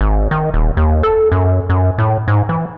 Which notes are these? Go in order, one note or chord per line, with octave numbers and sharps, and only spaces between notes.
G#1
D#3
D#1
D#2
A4
F#2
F#2
A2
G#2
E3